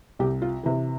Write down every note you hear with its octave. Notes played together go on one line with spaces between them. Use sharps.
C2 G4
F4
C3 E3